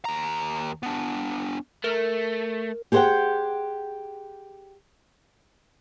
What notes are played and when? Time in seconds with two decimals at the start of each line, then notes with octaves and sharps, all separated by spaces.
0.05 D#2 A#5
0.83 B3 D4
1.84 A3 A#4
2.92 G4 G#4 C5 C#5 F#5 G5